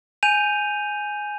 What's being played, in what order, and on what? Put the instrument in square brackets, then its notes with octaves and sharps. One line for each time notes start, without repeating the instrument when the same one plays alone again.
[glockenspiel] G#5 G6 D#7 F7